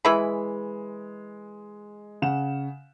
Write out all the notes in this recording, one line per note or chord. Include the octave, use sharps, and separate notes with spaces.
E3 G#3 E4 B5
C#3 F#5 E7